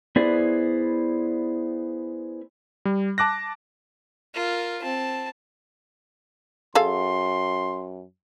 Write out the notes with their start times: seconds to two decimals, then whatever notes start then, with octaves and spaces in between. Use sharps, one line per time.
0.16 B3 E4 G#4 C5 D5
2.85 G3
3.18 A5 D6 F#6 A#6
4.35 F4 A#4
4.82 C4 A5
6.75 F#2 G#4 A4 F5 C6